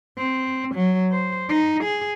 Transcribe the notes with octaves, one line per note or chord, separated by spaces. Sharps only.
C4
F#3
C5
D#4
G#4